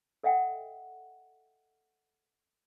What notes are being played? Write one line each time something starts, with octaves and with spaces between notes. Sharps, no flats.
A4 D#5 E5 F#5 G5